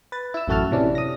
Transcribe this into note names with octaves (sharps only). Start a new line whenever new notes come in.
B4 A6
E4 E6
A1 F#2 A3 F#4 A5 F6
C3 E3 C#4 D4
D#6 A#6